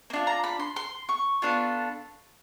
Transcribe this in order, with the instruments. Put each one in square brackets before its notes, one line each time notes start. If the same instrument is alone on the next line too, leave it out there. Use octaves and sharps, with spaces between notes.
[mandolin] A#3
D4 F4
A#5
B5
C6
C6
C#6
B3 D4 F4 A4